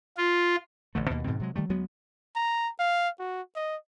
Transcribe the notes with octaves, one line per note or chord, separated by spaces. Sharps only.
F4
A1 D3 A3
D#2 B2 G#3 A#3
G#2 B2 D#3 C4
C3 F#3 G#3
D#3 G3 A3
D2 F#3 G#3 B3
A#5
F5
F#4
D#5